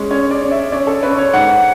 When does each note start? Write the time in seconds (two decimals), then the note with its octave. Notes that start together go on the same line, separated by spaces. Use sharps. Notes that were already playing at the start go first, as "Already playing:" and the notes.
Already playing: G#3 C#4
0.11 C#4 C#5
0.31 D5
0.41 C#4
0.52 E5
0.72 C#4 D5
0.87 A4
1.03 C#4 B4
1.18 C#5
1.33 G#2 F#5